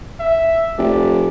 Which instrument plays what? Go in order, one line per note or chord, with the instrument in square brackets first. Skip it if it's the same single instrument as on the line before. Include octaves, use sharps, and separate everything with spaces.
[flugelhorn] E5
[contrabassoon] F1 [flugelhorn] D5